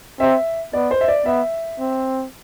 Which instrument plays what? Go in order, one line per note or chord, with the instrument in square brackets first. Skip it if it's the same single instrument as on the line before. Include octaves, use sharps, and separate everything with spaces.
[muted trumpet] C4 [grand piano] E5
[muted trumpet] B3 [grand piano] D5
[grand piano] C5
E5
D5
[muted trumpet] B3 [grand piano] E5
[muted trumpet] C4